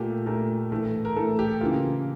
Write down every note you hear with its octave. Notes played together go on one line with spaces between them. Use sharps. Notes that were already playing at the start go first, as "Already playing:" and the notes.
Already playing: A#2 A3 G4
A#2 A3 A#4
A2 E3 A3
A#4
A2 E3 A3 A4
G4
C#3 E3 A#3 F4